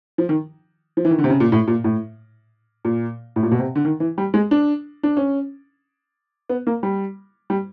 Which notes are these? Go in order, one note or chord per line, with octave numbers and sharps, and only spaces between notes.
F3
D#3
F3
E3
D#3
D3
C3
C#3
A#2
A2
A#2
A2
A#2
A2
A#2
B2
C3
D3
D#3
E3
G3
G#3
D4
D4
C#4
B3
A#3
G3
G3